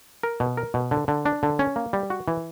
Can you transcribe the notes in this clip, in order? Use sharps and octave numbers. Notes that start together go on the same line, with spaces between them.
A#4
B2
A#4
B2
D3
D3
D4
D3
C#4
A#3
G3
F#4
E3